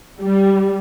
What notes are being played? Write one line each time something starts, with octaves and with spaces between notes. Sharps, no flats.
G3